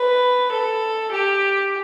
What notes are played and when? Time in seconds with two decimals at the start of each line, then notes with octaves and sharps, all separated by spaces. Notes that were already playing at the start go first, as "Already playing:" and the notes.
Already playing: B4
0.51 A4
1.11 G4